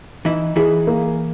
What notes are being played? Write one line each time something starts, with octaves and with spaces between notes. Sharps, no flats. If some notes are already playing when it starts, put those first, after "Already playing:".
E3 D#4 E4
E3 E4 G#4
A#3